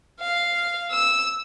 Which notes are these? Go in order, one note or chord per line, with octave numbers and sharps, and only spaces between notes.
F5
E6